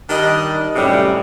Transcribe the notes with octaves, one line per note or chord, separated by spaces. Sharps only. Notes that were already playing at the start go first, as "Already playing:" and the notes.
D#3 G3 D4 D#5
F#2 A2 C3 G3